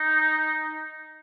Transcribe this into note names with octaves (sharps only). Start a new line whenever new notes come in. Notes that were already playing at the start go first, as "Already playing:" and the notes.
Already playing: D#4